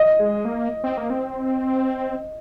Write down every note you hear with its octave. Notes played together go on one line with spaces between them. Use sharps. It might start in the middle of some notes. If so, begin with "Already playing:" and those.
Already playing: D#5
G#3
A#3
C4
A#3
C4